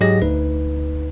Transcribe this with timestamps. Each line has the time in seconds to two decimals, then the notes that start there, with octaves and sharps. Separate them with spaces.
0.01 G#2 F#3 G4 G#4 D#5 A#6
0.22 D2 D#4 B4